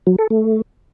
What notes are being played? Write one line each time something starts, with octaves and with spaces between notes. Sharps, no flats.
F#3
A4
A3